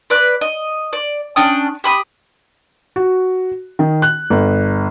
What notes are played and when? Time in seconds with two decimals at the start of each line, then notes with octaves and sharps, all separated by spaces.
0.10 B4 D5 F#6
0.41 D#5
0.93 D5
1.36 C#4 D4 G5 D#6
1.84 G4 B5 D#6
2.96 F#4
3.79 D#3
4.02 F#6
4.30 G1